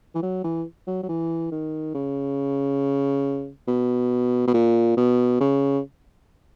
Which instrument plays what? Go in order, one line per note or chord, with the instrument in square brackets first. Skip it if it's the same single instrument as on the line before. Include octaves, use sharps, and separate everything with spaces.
[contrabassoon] E3
F#3
E3
F#3
F#3
E3
D#3
C#3
B2
B2
A#2
B2
C#3